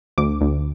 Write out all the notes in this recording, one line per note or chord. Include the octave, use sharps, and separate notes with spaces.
D2 D6
D2